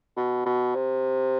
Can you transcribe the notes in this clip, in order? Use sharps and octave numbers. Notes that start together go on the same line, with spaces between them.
B2
B2
C3